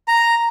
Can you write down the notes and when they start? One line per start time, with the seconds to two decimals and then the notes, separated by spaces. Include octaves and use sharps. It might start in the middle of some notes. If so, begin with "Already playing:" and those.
0.08 A#5